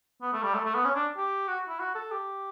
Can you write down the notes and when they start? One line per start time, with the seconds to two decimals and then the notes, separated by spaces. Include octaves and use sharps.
0.22 B3
0.33 A3
0.43 G3
0.54 A3
0.65 A3
0.75 B3
0.85 C#4
0.95 D4
1.17 G4
1.48 F#4
1.69 E4
1.79 F#4
1.95 A4
2.11 G4